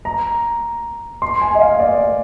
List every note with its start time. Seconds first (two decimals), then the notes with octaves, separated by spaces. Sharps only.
0.05 A#5
1.22 C6
1.41 G#5
1.55 D#5
1.61 F5
1.80 D5